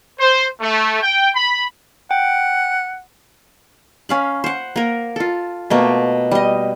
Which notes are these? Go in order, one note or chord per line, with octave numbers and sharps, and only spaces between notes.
C5
A3
G5
B5
F#5 G5
C#4 F5 B5
C5 F#5
A#3 A#4
F4 A4
B2 A3 A#3
G3 D#5